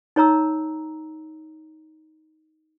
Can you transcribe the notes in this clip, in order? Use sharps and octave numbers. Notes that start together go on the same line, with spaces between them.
D#4 C#5 A#5 E6